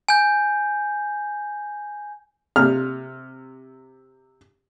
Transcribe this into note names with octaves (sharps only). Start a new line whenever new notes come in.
G#5 G6
C3 F6